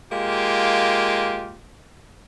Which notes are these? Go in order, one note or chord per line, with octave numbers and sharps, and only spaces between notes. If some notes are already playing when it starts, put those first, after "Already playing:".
G#3 A#3 F4 G4